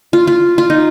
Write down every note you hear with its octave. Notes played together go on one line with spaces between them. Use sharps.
F4
F4
F4
D#4